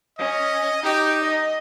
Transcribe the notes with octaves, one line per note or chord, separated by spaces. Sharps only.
C#4 D#5
D#4 G4
D#5